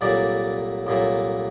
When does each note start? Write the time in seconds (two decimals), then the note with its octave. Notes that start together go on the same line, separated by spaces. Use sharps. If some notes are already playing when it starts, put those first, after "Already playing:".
0.01 C2 A#2 F#3 A3 D5
0.87 C2 A#2 F#3 A3